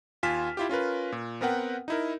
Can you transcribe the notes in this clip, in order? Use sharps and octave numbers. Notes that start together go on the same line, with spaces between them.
D#2 F4 G#5 F6 B6 E7
E4 F4 G4
C#4 F4 A#4 B4
A#2
B3 C4 A#4 B4 F#5 G5
D#4 E4 A#4